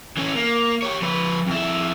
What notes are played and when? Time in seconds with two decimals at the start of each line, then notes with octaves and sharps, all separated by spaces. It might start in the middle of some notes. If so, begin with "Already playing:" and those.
0.17 E3 C#4
0.35 A#3
0.82 G4 C#5
1.02 F3 B4
1.47 F2 E4